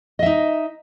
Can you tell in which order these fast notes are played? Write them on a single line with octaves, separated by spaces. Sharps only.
D#5 E5 D#4